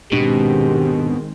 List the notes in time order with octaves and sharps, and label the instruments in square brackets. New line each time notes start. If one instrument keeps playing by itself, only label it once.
[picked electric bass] D#1 G#2 D4 [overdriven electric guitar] B2 [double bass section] D#3 G#3 C4 [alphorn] G4